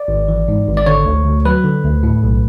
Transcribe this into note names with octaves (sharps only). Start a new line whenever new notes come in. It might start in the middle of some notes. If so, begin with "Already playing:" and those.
Already playing: D5
G#1
E3
G#2
G#1
D5
D3 C#5
D2
D2
F#3 B4
D3
D2
A2
B1